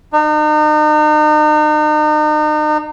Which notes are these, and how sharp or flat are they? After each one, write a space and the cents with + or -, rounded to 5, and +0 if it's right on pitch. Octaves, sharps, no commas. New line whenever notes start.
D#4 -40